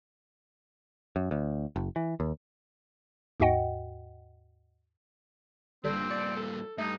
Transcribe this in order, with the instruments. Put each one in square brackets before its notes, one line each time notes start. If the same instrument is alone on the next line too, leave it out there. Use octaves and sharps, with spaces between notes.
[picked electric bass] F#2
D2
F#1
E3
D#2
[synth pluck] D#2 G#2 F#4 D#5 F#5 G5
[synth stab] G1 D3 G3 [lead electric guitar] G2 A#2 [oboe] C4
[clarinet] D5 [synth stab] C#7
[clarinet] A4
[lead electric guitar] G2 [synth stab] A3 [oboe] D#4